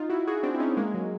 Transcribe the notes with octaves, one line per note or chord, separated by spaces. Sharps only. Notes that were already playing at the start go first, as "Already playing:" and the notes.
Already playing: D#4 F4
E4 F#4
F#4 G#4
C4 D4
E4
C#4 D#4
G#3 A#3
F#3